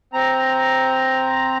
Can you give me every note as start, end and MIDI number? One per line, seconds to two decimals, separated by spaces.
0.13 1.58 60
0.13 1.58 82